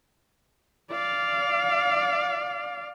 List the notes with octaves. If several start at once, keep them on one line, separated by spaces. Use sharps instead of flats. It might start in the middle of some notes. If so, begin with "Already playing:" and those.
D5 F5